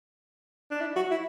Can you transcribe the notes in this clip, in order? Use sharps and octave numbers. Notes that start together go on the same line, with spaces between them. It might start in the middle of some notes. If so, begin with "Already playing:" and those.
D4
E4
F#4
E4